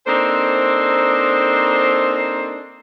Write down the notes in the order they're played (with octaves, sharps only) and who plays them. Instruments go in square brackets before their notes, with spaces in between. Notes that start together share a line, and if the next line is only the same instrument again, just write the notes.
[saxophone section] A#3 C4 D4 D#4 A4 C5